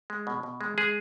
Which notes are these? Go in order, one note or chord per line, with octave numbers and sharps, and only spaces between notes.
G#3
B2
B2
G#3
G#3 G#4